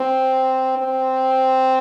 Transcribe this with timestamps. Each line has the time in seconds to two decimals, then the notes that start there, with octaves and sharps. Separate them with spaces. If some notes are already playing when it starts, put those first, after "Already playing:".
Already playing: C4
0.78 C4